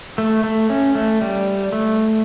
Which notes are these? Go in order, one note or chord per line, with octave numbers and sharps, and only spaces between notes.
A3
A3
C#4
A3
G3
A3